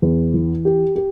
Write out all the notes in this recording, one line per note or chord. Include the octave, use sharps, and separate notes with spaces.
E2
E3
G4
G4